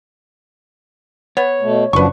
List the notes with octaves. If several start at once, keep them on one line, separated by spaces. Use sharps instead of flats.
B3 C#5
B2 A3
F#1 F#2 F3 F#3 D4 B4 C#6